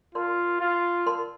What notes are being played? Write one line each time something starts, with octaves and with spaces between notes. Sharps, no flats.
F4 A#4 D5 A5 C6
F4
A#4 D5 A5 C6